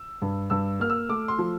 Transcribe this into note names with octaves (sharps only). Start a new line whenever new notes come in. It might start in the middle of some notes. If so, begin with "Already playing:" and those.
Already playing: E6
G2
G2 E6
A#3 F6
E6
A3 D6
C6
F3